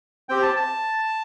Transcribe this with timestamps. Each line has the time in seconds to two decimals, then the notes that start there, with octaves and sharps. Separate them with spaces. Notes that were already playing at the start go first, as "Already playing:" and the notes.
0.29 C4 G4 G5
0.43 A5
0.56 A5